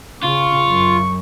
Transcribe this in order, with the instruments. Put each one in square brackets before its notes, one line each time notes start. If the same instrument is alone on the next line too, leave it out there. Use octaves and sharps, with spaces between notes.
[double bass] C#3 [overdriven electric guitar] F4 [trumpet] C#6
[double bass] F#2